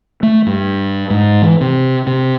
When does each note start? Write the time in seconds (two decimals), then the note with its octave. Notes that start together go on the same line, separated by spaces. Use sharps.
0.23 A3
0.47 G2
1.10 G#2
1.42 E3
1.61 C3
2.07 C3